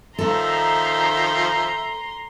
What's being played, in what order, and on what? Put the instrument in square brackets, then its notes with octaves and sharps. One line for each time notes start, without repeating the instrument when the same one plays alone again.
[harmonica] D#3 F3 E5 [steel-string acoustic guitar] A4 [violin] A#5 C6